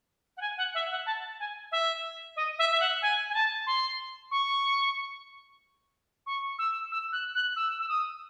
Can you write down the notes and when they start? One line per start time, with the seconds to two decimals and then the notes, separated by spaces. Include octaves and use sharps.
0.37 F#5
0.41 G#5
0.58 F#5
0.74 E5
0.91 F#5
1.06 A5
1.40 G#5
1.72 E5
2.36 D#5
2.59 E5
2.72 E5
2.80 F#5
3.02 G#5
3.30 G#5
3.34 A5
3.67 C6
4.31 C#6
6.26 C#6
6.59 E6
6.92 E6
7.12 F#6
7.35 F#6
7.56 E6
7.80 E6
7.89 D#6